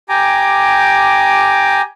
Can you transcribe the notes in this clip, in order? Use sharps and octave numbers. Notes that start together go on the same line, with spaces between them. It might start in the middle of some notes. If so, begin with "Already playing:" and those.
G4 G5 G#5 A#5 D6